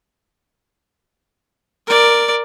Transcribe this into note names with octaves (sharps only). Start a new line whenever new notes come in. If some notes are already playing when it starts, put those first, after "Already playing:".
A#4 D5